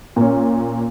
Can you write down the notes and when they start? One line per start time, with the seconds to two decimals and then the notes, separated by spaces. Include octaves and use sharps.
0.16 A#2 C#4